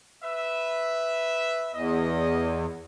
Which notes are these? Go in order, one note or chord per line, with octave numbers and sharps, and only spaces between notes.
B4 E5
E2 D#5